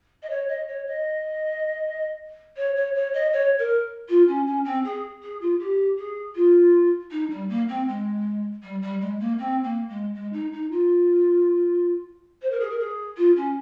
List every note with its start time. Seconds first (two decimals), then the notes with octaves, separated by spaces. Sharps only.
0.22 D#5
0.29 C#5
0.48 D#5
0.68 C#5
0.87 D#5
2.57 C#5
2.76 C#5
2.95 C#5
3.13 D#5
3.32 C#5
3.58 A#4
4.09 F4
4.27 C#4
4.46 C#4
4.65 C4
4.84 G#4
5.22 G#4
5.41 F4
5.59 G4
5.98 G#4
6.35 F4
7.11 D#4
7.30 G3
7.49 A#3
7.68 C4
7.87 G#3
8.63 G3
8.82 G3
9.00 G#3
9.20 A#3
9.38 C4
9.63 A#3
9.89 G#3
10.14 G#3
10.33 D#4
10.52 D#4
10.71 F4
12.42 C5
12.51 A#4
12.60 G#4
12.69 A#4
12.79 G#4
13.17 F4
13.36 C#4